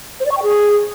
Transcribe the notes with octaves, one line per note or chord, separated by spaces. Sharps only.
C5
D5
C#6
G5
G#4